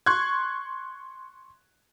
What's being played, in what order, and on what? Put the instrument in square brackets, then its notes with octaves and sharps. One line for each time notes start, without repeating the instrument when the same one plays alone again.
[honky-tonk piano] C6 C#6 F#6 G#6